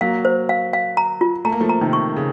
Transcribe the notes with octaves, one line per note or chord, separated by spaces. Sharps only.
F#3 A#3 F5
C5
F5
F5
A#5
F4
A3 A#5
A#3
F3 A3
A#5
C3 D#3
C#6
C#3